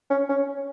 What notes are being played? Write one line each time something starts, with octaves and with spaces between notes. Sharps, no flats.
C#4
C#4